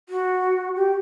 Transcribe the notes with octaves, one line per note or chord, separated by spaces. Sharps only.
F#4
G4